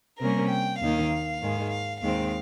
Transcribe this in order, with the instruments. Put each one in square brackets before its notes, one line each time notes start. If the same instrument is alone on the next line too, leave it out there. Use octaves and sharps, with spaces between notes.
[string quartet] C3 G3 A#3 C#4 A#4
G5
D#2 D#3 A#3 D#4 F5
G#2 D#3 G#3
F5
D#2 D#3 G#3 C4 F5